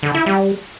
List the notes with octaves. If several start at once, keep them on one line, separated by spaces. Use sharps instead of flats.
D3
E4
G3